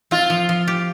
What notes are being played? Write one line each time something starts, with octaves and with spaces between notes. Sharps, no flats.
C4 F4
F3
F3
G4